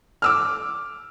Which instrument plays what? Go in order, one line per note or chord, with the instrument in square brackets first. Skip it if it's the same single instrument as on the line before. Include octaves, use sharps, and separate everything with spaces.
[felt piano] D6 E6 F6